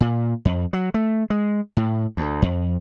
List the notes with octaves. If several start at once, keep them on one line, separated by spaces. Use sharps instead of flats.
A#2
F2
F#3
A3
G#3
A2
D2
F2